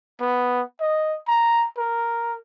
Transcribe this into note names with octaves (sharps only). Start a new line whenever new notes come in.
B3
D#5
A#5
A#4